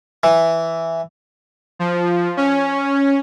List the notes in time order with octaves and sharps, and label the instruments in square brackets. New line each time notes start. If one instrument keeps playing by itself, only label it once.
[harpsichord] E3
[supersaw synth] F3
C#4